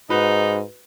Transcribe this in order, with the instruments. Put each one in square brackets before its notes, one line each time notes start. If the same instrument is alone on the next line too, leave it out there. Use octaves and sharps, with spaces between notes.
[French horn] G#2 [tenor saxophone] D#4 [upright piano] F#4 B4